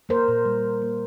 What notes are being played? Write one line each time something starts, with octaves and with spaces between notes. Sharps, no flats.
A#3 A#4 C5
A#2
G3
A#2
A#3